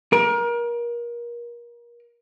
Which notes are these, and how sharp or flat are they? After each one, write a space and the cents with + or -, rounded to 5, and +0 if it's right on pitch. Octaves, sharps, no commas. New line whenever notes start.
A#4 +30